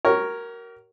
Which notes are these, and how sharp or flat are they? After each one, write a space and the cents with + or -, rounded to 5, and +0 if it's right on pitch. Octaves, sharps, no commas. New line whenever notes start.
F#4 +45 A#4 +0 C#5 +0